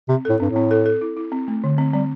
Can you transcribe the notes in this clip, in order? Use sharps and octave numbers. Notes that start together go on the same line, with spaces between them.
C3 C4
A2 A4
G2 C4
A2
C4
A4
A4
E4
E4
C4
A3
D3
C4
G3 C4